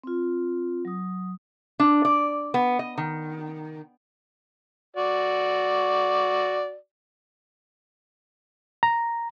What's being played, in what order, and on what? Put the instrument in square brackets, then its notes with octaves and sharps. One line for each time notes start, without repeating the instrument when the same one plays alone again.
[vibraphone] C4 F4
F#3 D#6
[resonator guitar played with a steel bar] D4
D5
B3
D#5
D#3
[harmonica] F#4 D5
[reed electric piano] A#5